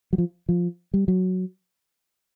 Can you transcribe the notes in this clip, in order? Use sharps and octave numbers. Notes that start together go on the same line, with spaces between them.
F#3
F3
F3
G3
F#3